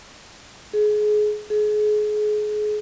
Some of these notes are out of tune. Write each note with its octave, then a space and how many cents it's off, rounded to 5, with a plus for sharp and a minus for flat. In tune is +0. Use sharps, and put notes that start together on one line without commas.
G#4 +25
G#4 +30